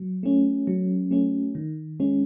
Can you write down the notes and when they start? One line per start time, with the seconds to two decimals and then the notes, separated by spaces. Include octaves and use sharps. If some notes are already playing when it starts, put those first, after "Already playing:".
Already playing: F#3
0.23 A3 C#4
0.67 F#3
1.11 A3 C#4
1.55 D#3
2.00 G#3 C#4